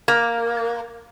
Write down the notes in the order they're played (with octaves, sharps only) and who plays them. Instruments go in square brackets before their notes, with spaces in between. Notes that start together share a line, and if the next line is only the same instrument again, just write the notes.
[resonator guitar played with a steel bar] A#3